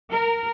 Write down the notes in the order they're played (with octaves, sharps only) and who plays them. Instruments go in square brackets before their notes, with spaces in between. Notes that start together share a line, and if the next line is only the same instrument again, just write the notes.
[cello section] A#4